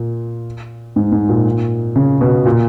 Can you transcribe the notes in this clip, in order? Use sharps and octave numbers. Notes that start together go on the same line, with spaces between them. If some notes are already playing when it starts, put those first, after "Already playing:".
Already playing: A#2
G#2
G#2
A#2
C#3
B2
A#2